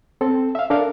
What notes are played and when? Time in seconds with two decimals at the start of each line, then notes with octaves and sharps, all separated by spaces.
0.21 C4 A4
0.55 E5 F5
0.70 D4 A4 A#4 F5